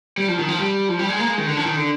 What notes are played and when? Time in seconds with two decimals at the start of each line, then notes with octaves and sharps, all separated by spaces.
0.18 G3
0.28 F3
0.39 D#3
0.48 F3
0.60 G3
0.89 F3
0.99 G3
1.09 G#3
1.19 A#3
1.28 G#3
1.38 D#3
1.47 D3
1.57 F3
1.66 D#3
1.76 D3